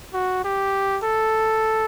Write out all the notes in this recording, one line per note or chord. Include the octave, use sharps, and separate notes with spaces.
F#4
G4
A4